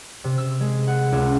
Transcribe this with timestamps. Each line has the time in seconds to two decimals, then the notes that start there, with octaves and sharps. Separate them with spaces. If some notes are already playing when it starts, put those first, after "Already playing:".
0.24 C3
0.38 E6
0.60 G#3
0.87 F#5
1.12 C#2